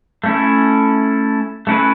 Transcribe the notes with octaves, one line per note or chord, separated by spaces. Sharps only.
A3 C#4 E4
A3 C#4 E4 B4